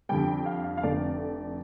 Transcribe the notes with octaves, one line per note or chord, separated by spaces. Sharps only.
F2 D3 G3 G5
F5
F5
F5
F1 F2 D3 A3 D5